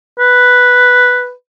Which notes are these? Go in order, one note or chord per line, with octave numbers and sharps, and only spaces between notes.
B4